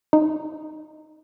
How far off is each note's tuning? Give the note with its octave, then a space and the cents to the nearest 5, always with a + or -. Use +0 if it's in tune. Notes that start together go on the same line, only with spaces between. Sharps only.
D#4 -5